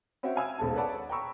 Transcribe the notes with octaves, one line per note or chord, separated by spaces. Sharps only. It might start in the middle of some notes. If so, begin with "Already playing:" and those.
C4 C#4 F#4 E5 G5
F5 G#5 E6 G#6
D#1 B1 G#3 A4 A5
B4 C#5 D5 F#5 A5
G5 A#5 B5 C#6 E6